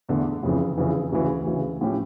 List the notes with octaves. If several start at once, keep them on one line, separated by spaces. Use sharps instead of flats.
E2 D3 A3
F1 F2 C#3 E3
F1 F2 C#3 E3
D2 C#3 E3
D2 C#3 E3
A2 F3 C#4 G4